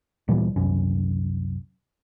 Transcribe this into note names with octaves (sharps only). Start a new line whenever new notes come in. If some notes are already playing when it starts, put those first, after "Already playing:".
D1 A#2 E3 G3
F#1 C2 F#2 C#4